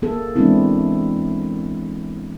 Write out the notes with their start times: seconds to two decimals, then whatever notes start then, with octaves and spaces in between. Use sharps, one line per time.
0.02 A#3 G#4 A4
0.36 E3 G#3 B3 C4 D4 E4